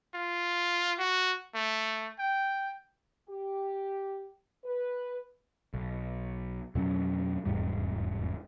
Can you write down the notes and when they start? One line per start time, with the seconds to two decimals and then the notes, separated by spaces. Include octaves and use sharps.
0.15 F4
0.98 F#4
1.55 A3
2.19 G5
3.29 G4
4.64 B4
5.74 B1
6.75 F2 B2 F#3 C#4
7.46 F1 E2 G#2 G3